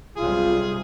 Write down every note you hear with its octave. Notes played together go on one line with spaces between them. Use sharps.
B1 C3 G3 F4 G#4